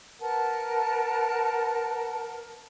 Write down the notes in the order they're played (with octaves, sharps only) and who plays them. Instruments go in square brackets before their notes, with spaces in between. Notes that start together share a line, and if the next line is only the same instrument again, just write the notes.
[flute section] A#4 B4 F#5 A5